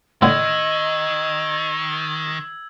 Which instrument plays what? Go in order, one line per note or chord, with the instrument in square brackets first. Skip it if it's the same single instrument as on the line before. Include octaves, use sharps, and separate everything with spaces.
[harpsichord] A2 D3 [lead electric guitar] D#3 [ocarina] D#5 [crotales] E6 G#6